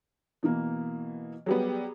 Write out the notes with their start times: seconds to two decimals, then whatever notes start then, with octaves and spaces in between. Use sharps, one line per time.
0.43 B2 E3 A#3
1.46 F#3 G3 B3 G#4